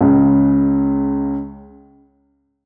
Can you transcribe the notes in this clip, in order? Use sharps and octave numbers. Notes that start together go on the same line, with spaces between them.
C#2 C#3 G#3